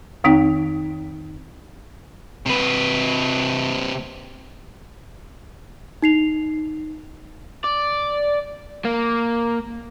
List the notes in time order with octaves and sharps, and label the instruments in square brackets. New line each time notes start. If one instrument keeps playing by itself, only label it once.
[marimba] F2 D#3 C4 D#4 G5
[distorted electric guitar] C3 B4
[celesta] D#4 C7 F7
[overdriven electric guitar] D5
A#3